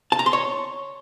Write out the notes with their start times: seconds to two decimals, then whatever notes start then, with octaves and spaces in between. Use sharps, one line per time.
0.12 A5
0.19 A#5
0.26 C6
0.33 C#5